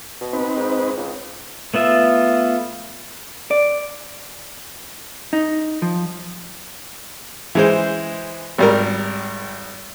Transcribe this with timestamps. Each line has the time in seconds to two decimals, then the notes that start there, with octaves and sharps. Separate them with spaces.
0.21 B2
0.33 C4 D#4 B4
0.56 G#2
0.96 C#2
1.74 A3 B3 F4 E5
3.51 D5
5.33 D#4
5.82 F3
7.55 E3 G#3 C5
8.58 G#1 G3 A#4